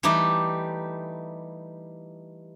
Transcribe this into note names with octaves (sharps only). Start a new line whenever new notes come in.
E3 G3 A3 D#4 G4